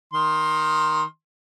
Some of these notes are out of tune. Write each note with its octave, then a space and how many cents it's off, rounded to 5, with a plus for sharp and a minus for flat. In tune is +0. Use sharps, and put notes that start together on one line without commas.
D#3 +5 C6 +15